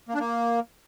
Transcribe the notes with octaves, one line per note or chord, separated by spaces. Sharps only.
A#3
D4
A#3